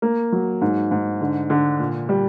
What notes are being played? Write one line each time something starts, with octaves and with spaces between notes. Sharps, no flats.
A#3
F#3
G#2
G#2
D3
D3
A#2
G3